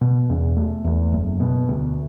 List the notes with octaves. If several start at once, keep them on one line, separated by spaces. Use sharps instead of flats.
B2
E2
A3
E2
F#1
B2
D2